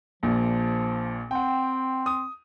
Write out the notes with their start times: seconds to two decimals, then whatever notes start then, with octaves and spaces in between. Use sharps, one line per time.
0.23 A#1 A#2 F3
1.31 C4 F#5 G5
2.06 D#6